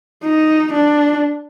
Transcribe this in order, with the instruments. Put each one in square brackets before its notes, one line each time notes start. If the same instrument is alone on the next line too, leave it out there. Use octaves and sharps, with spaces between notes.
[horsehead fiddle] D#4
D4